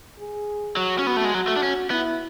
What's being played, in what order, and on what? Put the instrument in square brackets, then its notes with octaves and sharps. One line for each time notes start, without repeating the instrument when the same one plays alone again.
[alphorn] G#4
[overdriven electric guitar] F#3 [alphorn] F#4
[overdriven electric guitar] C#4
[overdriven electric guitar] B3 [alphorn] F#4
[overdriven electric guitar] A3
G#3
[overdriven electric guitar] F#3 [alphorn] F#4
[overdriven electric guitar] A3
D4
C#4
[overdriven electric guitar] B3 [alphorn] E4